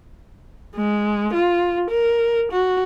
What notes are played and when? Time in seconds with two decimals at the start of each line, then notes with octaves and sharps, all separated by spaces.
0.75 G#3
1.34 F4
1.90 A#4
2.52 F#4